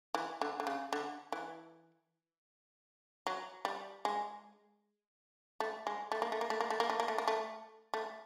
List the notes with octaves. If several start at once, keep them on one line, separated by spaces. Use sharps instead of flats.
E3
D3
D3
C#3
D3
E3
F#3
G3
G#3
A3
G#3
A3
A#3
A3
A#3
A3
A#3
A3
A#3
A3
A#3
A3
A#3
A3
A3